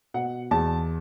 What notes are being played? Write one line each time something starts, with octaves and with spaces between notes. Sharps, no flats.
B2 F#5
E2 A5